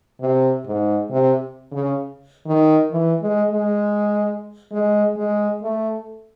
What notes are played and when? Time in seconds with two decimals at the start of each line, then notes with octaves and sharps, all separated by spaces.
0.21 C3
0.66 G#2
1.11 C3
1.72 C#3
2.47 D#3
2.91 E3
3.21 G#3
3.51 G#3
4.72 G#3
5.16 G#3
5.62 A3